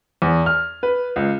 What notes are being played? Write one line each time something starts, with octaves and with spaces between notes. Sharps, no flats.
E2
F6
B4
C#2